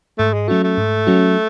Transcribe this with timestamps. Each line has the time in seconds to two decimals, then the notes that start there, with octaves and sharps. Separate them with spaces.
0.18 G#2 A3
0.33 G#3
0.48 F#3 A3 C#4 F#4
0.64 A3
0.78 G#2
1.07 F#3 C#4 F#4